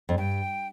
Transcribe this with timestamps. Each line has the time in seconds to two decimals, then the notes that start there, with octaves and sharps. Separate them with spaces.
0.09 F2
0.18 G2 G5